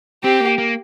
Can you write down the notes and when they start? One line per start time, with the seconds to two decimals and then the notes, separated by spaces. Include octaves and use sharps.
0.24 C4 G4
0.40 A#3
0.58 A#3